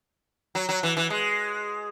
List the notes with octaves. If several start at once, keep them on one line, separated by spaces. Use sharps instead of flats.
F#3
F#3
E3
E3
G#3